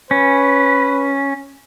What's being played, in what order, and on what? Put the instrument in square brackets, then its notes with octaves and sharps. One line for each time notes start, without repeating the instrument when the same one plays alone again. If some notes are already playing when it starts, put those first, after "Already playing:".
[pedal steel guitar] C#4 [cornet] B4